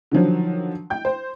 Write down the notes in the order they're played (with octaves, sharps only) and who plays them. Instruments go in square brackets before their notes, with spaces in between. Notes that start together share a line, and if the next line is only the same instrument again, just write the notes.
[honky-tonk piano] D3 D#3 F3 F#3
G5 G6
C5